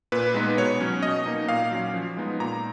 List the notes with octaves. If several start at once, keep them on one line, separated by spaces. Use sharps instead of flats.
A#2 B4
G#3 B3 D#4
B2 C#5
F#3 C#4
B2 D#5
A#3 D#4
A#2 F5
F#3 C#4
F3
G#3 B3 D#4
A#2 A#5